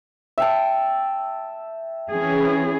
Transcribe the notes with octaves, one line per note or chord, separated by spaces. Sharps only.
E5 G5 A5
E3 C#4 G#4